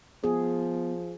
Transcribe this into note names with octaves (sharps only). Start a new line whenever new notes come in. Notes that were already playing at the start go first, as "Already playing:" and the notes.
F3 B3 G#4